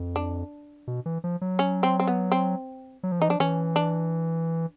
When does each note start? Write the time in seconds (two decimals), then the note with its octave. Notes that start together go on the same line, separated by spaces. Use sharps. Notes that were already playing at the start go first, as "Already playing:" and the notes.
Already playing: F2
0.16 D4
0.87 B2
1.06 E3
1.24 F3
1.41 F#3
1.59 C#4
1.83 C4
1.99 C4
2.07 B3
2.32 C4
3.03 F#3
3.12 F3
3.20 E3 D#4
3.28 F3 D4
3.40 E3 C#4
3.76 D4